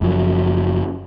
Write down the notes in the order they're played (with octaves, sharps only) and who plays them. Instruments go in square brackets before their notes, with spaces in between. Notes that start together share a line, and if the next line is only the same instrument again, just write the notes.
[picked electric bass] F#1 F#2 F3 F#3